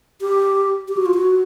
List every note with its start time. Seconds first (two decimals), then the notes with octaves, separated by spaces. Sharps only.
0.21 G4
0.88 G4
0.97 F#4
1.06 F4
1.14 F#4